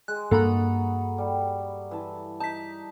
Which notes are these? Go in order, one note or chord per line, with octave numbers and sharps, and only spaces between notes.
G#3 F#6
G2 A#3 F#4 A4 D#5 A#5 B5
G3
E3 A5
D#4 A5 B6